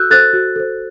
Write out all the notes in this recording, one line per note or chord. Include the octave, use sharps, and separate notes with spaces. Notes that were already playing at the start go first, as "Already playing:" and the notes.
Already playing: F#4 A4 E6 F#6 G6
A4 C5 F#6 A6
F#4
A4 C5